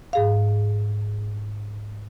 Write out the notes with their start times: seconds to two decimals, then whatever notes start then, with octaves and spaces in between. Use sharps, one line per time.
0.13 G#2 G#4 F5